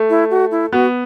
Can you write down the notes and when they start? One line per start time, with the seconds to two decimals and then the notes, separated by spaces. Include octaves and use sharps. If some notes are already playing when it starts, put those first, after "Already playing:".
Already playing: A3
0.10 E4
0.31 F#4
0.51 E4
0.72 B3 F#4